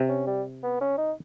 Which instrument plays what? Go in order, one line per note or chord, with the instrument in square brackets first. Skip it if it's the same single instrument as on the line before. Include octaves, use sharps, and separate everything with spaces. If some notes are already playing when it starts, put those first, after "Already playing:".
Already playing: [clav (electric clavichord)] C3
[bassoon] C#4
G3
B3
C#4
D#4